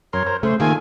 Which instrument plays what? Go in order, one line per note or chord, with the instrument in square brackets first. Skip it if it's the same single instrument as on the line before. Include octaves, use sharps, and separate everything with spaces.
[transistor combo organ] F#2 A#4 C6 [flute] C#5
[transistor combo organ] A#4 C5
[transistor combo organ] C#3 [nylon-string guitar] A3 [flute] C5
[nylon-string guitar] D#3 A#3 [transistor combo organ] A3 F4 G#4 [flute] G#5